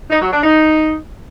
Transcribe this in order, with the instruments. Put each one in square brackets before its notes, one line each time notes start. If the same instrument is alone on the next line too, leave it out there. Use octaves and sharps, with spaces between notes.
[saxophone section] D#4
F#3
D4
D#4